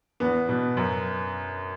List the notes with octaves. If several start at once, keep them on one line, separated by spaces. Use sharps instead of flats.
E2 B3
B2
F#2